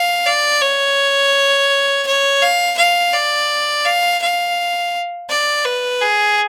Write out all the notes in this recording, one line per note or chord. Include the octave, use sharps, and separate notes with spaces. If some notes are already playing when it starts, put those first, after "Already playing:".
Already playing: F5
D5
C#5
C#5
F5
F5
D5
F5
F5
D5
B4
G#4